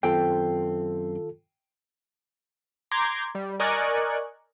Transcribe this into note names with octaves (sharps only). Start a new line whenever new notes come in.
F#2 D#3 C4 F4 A4 G5
A#5 C6 D6 G6 G#6
G3
A#4 D5 D#5 G#5 C#6 F#6